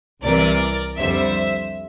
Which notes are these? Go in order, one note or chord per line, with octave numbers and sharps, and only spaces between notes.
C2 C3 E3 A#4 D5
F2 D3 G3 C5 E5